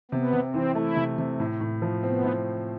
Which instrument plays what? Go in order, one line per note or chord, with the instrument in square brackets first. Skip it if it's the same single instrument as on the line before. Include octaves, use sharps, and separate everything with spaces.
[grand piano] C3 [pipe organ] B3
[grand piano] C3
[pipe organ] C4
[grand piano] E3
[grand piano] A3 [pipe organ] E4
[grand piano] C3
C3
A2
A2
F3
[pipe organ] B3 [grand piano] C4
[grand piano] A2